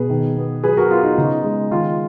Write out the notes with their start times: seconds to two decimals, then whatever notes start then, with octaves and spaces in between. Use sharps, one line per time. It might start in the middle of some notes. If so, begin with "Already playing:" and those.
Already playing: B2 G#4 B4
0.10 D#3
0.37 B3
0.63 F#3 G#4 B4
0.77 F#4 A#4
0.90 B3 F4
1.03 D#4
1.18 C#3 D#4
1.44 G#3
1.71 D#3 F4